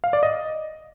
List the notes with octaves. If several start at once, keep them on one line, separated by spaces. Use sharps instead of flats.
F5
D5
D#5